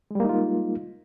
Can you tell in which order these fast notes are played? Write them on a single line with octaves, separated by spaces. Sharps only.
G#3 G3 A#3 D#4 F4